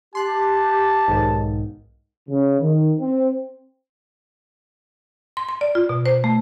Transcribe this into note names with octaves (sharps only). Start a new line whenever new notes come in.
G4 A5 C6 F#6
B1 G#2 D#3
C#3
D#3
C4
C6
C6
D5
F4
B2
C5
A3